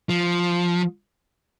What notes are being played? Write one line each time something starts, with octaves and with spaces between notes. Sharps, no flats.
F3